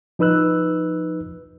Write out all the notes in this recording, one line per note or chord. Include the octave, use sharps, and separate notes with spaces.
F3 D#4 B4 E6 F#6